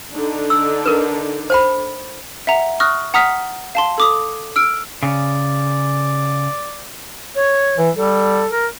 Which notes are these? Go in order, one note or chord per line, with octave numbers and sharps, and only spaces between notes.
D3 D4 D#4
E6
A#4 B4
C5 G5 B5
E5 F#5 A#5
C#6 D#6 F6 F#6 A#6
F#5 A#5 D#6 F6 B6
F5 A5 C6
A4 D6 D#6
E6 F6 D7
C#3 D5
C#5
E3
G3 A4
A#4